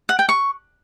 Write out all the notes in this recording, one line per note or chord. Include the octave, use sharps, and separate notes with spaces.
F#5
G5
C#6